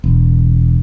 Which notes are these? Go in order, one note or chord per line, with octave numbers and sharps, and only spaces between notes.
E1